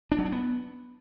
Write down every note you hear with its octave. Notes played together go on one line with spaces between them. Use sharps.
D4
F#3
D4
B3